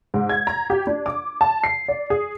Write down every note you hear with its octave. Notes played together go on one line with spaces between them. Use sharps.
G#2
G#6
A#5
G4
D4
D6
A5
C7
D5
G#4